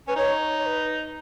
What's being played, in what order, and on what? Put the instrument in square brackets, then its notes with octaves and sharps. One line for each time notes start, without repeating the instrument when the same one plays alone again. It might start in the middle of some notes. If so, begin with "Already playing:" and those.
[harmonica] C#4 [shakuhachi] B4
[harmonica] D#4 [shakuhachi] C#5
[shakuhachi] C#5
B4